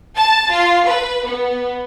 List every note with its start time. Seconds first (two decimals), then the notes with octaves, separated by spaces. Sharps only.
0.17 A5
0.51 F4
0.85 B4
1.25 B3